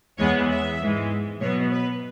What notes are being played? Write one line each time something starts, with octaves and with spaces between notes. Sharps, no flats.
E2 E3 G#3 B3 C#5
E5
G#2 E3 G#3
B2 F#3 B3 C#5
B4